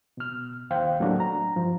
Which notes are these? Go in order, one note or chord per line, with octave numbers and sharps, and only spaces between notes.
B2 F6
D#2 C5 F5 G5
A2 F#3 A3 A#3 D4 F#4
A#5
G2 F3